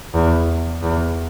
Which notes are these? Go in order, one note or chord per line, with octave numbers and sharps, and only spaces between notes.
E2
E2